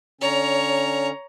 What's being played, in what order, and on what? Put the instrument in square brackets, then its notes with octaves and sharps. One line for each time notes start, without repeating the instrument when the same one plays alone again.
[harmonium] D3 C#4 [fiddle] C#5 A#5